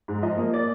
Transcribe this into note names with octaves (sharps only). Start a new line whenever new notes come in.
G#2
F3 D#5
A#3
A#3 D5